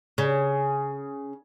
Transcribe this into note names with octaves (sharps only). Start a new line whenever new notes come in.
C#3